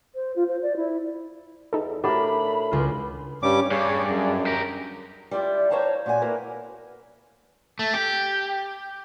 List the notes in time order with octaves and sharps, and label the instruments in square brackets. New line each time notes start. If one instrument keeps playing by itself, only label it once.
[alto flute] C5
F4
C5
D5
E4
[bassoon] E2 [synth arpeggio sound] D#4 A4
[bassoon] A2 [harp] D4 A#4 [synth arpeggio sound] F#4 G4 [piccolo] B5
[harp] C#2 F4
[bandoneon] G2 G3 D6 [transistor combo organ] C#4
[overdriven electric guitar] G2 [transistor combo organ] G#4 D5 [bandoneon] C#5
[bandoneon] F#2
[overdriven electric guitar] G4 A#4
[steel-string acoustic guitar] G3 E4 F4 D5
C5 C#5 F5 A5 A#5
A#2 F#4 G4 G#5
A#3 E4 A#4 B4
[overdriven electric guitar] A3
G4